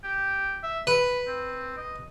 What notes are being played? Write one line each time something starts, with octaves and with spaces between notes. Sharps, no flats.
G4
E5
B4 B5
C4
D#5